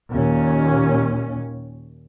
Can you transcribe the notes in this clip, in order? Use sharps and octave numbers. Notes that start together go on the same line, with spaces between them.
D#2 A#2 C#4